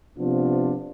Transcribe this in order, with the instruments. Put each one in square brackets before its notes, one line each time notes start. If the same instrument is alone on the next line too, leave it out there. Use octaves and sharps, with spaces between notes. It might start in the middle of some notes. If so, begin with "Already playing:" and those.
[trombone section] C3 F3 B3 D4 F4